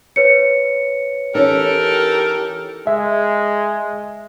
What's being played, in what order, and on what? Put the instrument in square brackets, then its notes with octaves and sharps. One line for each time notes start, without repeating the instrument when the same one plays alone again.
[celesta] B4 C#5 C#7
[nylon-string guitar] E3 C#4 D#4 [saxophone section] G4 A4 A#4
[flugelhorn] G#3 [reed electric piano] E5